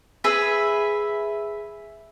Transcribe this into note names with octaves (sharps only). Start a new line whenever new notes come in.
G#4 B4 E5